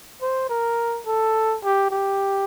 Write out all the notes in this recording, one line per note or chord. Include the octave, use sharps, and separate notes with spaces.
C5
A#4
A4
G4
G4